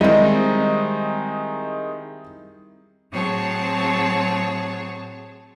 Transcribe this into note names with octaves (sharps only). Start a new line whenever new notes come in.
D#3 G3 G#3 C4 D#4 E4 D#5
A2 F#3 C4 G#4 C#5 A5